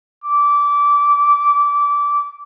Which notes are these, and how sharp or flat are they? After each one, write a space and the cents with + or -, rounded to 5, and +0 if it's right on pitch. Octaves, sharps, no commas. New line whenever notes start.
D6 -20